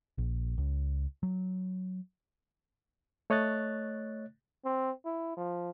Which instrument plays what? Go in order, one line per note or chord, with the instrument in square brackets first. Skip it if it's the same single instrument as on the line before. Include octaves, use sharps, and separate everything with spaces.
[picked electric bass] A#1
C#2
F#3
[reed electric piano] A3 C#5 D#5 F#6 A6
[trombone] C4
E4
F3